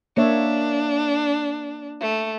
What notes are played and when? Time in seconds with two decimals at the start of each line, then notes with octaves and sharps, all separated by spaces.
0.17 A#3 D4 C#5 E5
2.01 A3